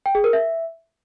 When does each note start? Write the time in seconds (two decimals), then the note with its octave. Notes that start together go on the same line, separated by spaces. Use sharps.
0.06 G5
0.15 G#4
0.24 A#4
0.33 E5